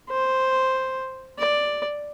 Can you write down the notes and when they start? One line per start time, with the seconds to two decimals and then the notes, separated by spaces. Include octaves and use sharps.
0.10 C5
1.39 D5